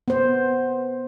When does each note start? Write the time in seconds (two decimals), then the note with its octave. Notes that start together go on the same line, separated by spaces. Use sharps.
0.08 B3 C5